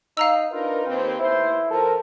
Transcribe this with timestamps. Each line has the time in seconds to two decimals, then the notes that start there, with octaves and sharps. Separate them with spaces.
0.17 D#4 F5 A#5 E6
0.53 D4 D#4 F4 A#4 B4
0.85 D#2 C4
1.19 D#2 A2 E4 C5
1.71 F3 A4 A#4